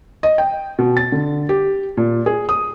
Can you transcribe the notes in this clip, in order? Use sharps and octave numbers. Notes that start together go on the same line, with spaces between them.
D#5
G5
B2
A6
D3
G4
A#2
G#4
D#6